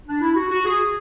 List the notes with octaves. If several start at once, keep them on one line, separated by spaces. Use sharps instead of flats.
D4
E4
F#4
F#4
G#4